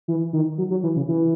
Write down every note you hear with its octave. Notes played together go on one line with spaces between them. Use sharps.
E3
D#3
F#3
F#3
E3
C#3
E3